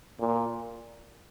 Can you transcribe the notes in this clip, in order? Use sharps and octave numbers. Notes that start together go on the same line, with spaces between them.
A#2